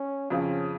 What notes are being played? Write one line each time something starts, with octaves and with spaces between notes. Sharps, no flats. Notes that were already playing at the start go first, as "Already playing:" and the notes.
Already playing: C#4
F2 C#3 F3 C#4